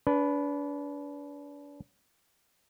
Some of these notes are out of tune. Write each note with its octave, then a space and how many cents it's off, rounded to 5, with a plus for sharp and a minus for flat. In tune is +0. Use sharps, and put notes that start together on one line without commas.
D4 -35 B4 +0